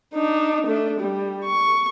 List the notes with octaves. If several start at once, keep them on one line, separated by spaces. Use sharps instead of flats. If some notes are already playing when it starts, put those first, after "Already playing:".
D4 D#4
A3 D4
G3
C#6